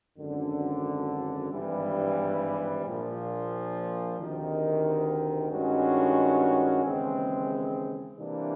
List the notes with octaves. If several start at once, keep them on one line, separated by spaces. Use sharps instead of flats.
G#1 F#2 D3
G#1 G2 E3 G3
A#1 A#2 F3
D2 C3 D#3
G2 D#3 G#3 C#4 F#4
D#2 C#3 E3 G#3 C4
C3 E3 G3 A#3 D4